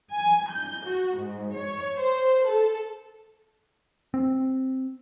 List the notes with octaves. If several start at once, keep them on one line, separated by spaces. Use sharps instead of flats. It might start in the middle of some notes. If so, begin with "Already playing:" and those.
G#5
G6
F#4
G#2
C#5
C5
A4
C4